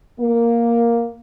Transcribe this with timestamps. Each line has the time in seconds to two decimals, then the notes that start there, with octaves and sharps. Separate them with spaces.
0.20 A#3